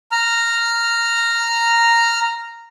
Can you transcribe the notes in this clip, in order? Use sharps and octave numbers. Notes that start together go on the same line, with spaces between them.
A#5 F6